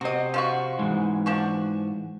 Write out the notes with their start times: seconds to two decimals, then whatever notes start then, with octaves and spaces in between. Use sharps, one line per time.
0.01 C3 C4 F#4 D#5
0.34 F3 F4 F#4
0.79 G#2 E3 G#3
1.26 F3 D4 F#4